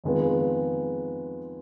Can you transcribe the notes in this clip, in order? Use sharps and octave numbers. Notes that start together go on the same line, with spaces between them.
F2 D#3 G#3 B3 F4